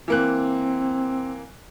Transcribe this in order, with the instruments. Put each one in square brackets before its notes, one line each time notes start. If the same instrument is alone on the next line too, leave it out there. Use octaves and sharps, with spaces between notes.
[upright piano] E3 A#3 F#6 [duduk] C4